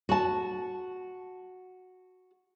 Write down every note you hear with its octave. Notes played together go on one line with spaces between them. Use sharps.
F#4 A5